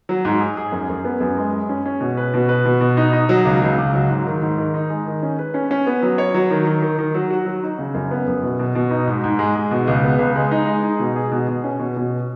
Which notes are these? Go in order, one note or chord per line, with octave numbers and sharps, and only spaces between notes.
F#3
G#2
G#4
G#4
F#2
F#2
B3
F#2
G#3
G#3
C#4
C#4
B2
B4
B2
B4
B2
B2
D#4
D#4
F#3
C#2
C#2
C#2
F#3
G#2
D#3
G#2
D#3
D#4
G#3
D#3
C#4
B4
C#4
C#4
B3
F#3
C#5
F#3
D#3
D#3
D#3
D#3
F#3
F#4
F#3
D#4
C#3
F#2
B3
F#2
B2
B2
B2
D#4
G#2
G#2
G#3
G#3
B2
C#2
B3
C#2
G#3
D#4
G#3
D#4
B2
G#4
B2
B2
C#4
B2
B2